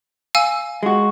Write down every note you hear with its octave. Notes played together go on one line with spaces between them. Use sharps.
F5 G#5 E6
G#3 F#4